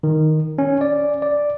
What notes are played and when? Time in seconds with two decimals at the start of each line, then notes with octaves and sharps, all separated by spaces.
0.03 D#3
0.58 C#4
0.81 D5
1.22 D5